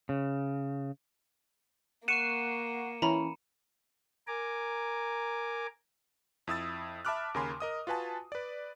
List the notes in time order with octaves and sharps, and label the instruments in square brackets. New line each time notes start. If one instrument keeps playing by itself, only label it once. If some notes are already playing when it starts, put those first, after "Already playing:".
[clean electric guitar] C#3
[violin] A#3 [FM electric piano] F#5 C#6 C7 [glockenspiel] C#7 D#7 E7
[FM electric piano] E3 C#4 [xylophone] A#5 B5
[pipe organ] A#4 G#5 A#5 D6
[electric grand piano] F2 E4 D#6 E6 A6
E5 A5 B5 D6 F6 F#6
D#2 C#3 A#4 G#5 B5 C6
A#4 D#5 D#6
F4 F#4 B4 G#5 A5
B4 D5